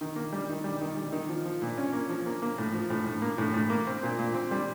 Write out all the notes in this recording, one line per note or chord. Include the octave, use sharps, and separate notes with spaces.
D#3
A#3
G3
D#3
G3
D#3
G3
D#3
F3
F3
A#2
C#4
A#3
F3
A#3
A#3
A2
F3
A2
A2
A#3
A2
A2
A#3
C4
A#2
A#2
C4
G3